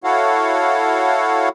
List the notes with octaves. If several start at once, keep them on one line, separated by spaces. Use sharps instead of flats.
E4 F#4 A4 C#5 F5 F#5